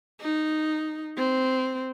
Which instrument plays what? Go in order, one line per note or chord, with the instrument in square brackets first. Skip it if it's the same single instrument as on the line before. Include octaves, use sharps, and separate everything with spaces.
[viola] D#4
C4